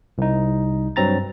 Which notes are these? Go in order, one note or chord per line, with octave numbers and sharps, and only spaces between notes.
C2 D#4
G2 F#3 C4 A#5 A6